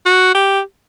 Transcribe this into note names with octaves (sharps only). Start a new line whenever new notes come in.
F#4
G4